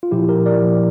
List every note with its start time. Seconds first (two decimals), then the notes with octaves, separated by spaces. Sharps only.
0.03 F4
0.11 A#2 F3 E4 G4
0.29 G4 A#4
0.46 A#4 D5
0.63 A#2 F3